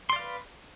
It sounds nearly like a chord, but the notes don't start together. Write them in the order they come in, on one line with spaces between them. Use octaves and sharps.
C6 D5 F5 B4